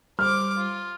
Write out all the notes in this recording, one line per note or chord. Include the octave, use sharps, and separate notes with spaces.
G3 C5 D6 F6
F4